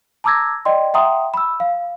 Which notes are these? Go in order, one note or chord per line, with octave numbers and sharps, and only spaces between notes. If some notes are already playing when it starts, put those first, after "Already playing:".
A5 A#5 D6 E6 G#6 A#6
D5 D#5 G5 C6
E5 F#5 G5 A#5 C6 D#6
B5 E6
F5